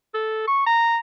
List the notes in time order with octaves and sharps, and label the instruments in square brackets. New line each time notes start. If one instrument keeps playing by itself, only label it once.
[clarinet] A4
C#6
A#5